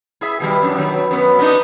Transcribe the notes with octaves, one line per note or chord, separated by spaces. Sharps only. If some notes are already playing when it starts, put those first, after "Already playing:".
E4 G#4 E5
B2 D#3 G3
F#2 D4
B2 D#3 F#3
F#2 B3
B3 D4 D#4